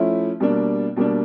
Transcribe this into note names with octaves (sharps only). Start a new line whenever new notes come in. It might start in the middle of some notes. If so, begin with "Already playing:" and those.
Already playing: F3 A3 C#4 E4
B2 G3 A#3 D4
B2 G3 A#3 D4